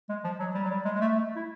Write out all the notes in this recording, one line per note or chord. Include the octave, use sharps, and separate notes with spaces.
G#3
F3
F#3
G3
F#3
G3
G#3
G#3
A3
A3
E4